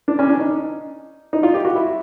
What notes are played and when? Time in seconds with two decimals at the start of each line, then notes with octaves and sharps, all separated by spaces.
0.08 D4
0.19 C#4
0.29 D4
0.39 D#4
1.33 D#4
1.43 F4
1.54 G4
1.65 F#4
1.75 E4